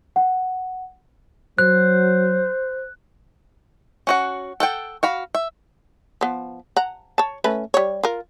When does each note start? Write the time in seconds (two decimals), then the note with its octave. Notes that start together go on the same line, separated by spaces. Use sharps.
0.16 F#5
1.58 F#3 C5 F#6
4.07 C#4 F#4 F#5
4.60 A4 F#5 G5
5.03 F#4 F5 B5
5.35 E5
6.21 F3 B3
6.76 F#5 A#5
7.18 C#5 A5
7.44 A3 C#4 B4
7.74 G3 C#5
8.03 F4 A#4